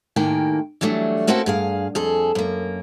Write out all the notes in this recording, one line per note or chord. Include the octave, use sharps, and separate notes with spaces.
D#2 A2 D#3 A#3 G5 G#5
E3 F#3 G3 A3 D4
A3 A#3 C4 C#4 F#4 A4
G2 G#4 F5
F2 G#4 A4
F#2 A#3